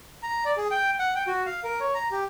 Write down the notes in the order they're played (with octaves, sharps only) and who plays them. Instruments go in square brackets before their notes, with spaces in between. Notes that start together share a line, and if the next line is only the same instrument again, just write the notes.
[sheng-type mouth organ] A#5
D5
G#4
G5
F#5
G5
F#4
F5
A#4
C#5
A#5
G4